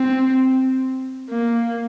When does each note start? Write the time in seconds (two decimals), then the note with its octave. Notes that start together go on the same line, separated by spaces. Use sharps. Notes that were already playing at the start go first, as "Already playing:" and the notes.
Already playing: C4
1.30 A#3